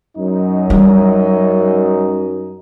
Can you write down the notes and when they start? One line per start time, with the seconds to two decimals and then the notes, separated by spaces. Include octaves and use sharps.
0.18 F#2 D#4
0.70 G3